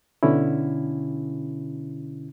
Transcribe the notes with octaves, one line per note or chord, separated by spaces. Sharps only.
B2 D3 C#4 E4